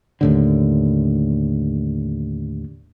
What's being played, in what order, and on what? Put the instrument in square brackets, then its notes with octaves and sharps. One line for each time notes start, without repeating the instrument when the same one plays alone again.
[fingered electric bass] D#2 A2 D3